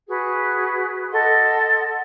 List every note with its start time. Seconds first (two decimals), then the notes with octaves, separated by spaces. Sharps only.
0.08 F#4 G#4 B4
1.12 A4 D#5 F#5 C6